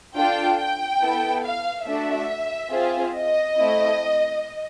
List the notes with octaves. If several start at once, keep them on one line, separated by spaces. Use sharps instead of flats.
D4 F4 A4 G5
G5
B3 E4 A4
F5
A3 D4 F#4 E5
C4 F4 G#4
D#5
A3 C4 E4